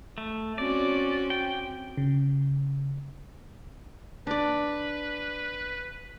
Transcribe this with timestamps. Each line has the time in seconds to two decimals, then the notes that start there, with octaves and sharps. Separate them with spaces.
0.18 A3
0.58 C4 C#4 F#4 D5
1.30 G5
1.97 C#3
4.27 D4 B4 D5